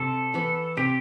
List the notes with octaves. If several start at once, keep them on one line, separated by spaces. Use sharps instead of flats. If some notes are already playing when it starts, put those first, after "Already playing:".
Already playing: C3 A4
E3 B3
C3 G4